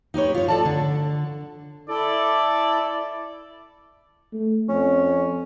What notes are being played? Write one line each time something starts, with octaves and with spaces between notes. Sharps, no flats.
D#4 G4 B4 C#5
F4 C#5
A4 D5 A5
D3
E4 A4 D5
A3
F2 C#4